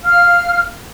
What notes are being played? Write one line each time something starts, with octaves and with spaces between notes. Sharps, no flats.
F5 F6